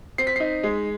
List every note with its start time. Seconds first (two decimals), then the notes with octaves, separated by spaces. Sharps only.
0.18 C4 C7
0.27 B6
0.36 D#4 C7
0.63 G#3